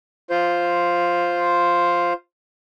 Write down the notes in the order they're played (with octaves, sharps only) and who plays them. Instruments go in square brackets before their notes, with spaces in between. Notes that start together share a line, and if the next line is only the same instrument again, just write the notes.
[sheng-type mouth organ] F4 C5